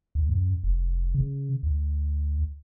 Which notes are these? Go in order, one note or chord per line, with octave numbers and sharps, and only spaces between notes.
D2
F#2
F1
C#3
D2